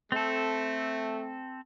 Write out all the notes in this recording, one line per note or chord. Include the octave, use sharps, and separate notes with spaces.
A3 C4 A4